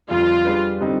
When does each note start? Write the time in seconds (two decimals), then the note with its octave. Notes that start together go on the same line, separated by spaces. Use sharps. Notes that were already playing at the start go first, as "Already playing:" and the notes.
0.08 F2 D3 G3 D4 F4
0.45 G3 D4 G#4 B4
0.81 D3 G3 C4 D#4